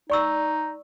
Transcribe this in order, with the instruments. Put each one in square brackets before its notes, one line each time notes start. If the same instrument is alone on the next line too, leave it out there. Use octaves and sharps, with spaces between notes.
[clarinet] D#4 [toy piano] D5 C#6 E6